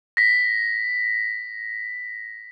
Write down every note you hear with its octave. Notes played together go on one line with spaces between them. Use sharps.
A#6 B6